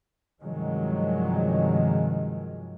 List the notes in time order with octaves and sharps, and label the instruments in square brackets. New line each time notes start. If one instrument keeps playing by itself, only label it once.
[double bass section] G2 C3 D#3 F3 F#3 G#3